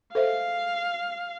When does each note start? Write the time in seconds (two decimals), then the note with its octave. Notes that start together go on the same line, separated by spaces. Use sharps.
0.15 A4 C5 E5 F5